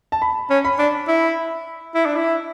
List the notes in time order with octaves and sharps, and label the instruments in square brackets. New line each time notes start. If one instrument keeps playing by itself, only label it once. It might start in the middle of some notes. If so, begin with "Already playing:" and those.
[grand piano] A5
B5
[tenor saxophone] C#4
[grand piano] B5
[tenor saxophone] D4
E4
E4
D4
E4